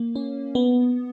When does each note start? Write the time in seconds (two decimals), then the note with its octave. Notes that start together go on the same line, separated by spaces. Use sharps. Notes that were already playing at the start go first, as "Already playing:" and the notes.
Already playing: A#3
0.16 C#4
0.55 B3